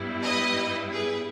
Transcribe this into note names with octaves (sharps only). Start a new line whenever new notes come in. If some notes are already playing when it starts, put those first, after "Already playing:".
Already playing: G2 G3 B3 E4
B4 D#5
G#4 B4